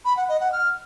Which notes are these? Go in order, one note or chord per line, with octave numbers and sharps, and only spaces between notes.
B5
F#5
D#5
F#5
F6